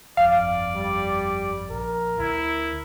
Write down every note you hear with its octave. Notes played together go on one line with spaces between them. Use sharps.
G1 F2 D5 F5
G3
A#1 A#4
D2 E4